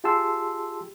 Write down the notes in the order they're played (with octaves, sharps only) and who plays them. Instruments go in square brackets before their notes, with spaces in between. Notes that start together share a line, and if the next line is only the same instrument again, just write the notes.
[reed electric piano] F4 G4 G#4 A5 C6 E6